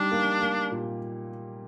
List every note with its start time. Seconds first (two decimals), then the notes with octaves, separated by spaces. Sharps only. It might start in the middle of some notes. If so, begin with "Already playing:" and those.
Already playing: G3 D4 D#4
0.11 A#3
0.41 A#3
0.72 A#2